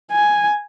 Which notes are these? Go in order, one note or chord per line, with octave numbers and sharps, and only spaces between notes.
G#5